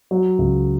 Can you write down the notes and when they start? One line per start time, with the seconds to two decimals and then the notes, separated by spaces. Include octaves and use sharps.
0.11 F#3
0.39 C#2